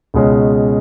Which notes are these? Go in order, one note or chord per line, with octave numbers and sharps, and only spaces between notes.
C#2 B2 G#3 C#4